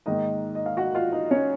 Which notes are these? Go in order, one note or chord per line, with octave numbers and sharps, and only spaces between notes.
G#2 D#3 A#3 D#4 D#5
D#5
F5
F#4 F#5
F4 F5
D#4 D#5
C#4 C#5